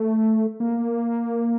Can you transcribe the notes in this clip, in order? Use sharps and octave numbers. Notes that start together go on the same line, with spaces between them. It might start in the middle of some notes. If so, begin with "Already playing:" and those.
Already playing: A3
A#3